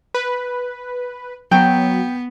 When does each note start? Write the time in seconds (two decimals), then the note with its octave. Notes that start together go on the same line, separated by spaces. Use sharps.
0.14 B4
1.51 F#3 B3 G5